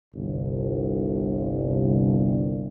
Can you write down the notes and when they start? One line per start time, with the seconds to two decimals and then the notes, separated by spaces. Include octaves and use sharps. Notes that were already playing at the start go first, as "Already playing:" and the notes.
0.15 G1 C2